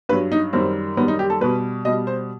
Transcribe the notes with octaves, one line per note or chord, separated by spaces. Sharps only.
G2 F#3 B4
D#4
F#2 D#3 G3 C4
F#2 D#3 G3 B3
D#4
G4
A4
B2 G3 B4
B2 G3 D#5
C5